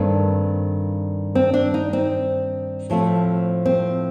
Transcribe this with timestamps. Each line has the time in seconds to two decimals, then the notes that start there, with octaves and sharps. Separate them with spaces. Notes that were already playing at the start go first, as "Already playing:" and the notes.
Already playing: G2 D#3 A3 C4
1.35 C4
1.54 D4
1.74 D#4
1.93 C4
2.90 A2 F3 A3 C4
3.66 C4